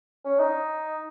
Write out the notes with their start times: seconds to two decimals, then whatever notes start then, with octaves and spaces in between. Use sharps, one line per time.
0.25 C#4
0.39 D#4